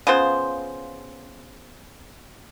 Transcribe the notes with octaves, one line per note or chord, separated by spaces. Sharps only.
C#3 B3 F4 C5